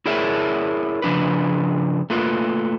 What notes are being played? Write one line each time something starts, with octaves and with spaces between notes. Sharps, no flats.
E4 G#4 A#4 C#5 D5 E5
C#3 F3 D4 B4
A3 A#3 F4 B4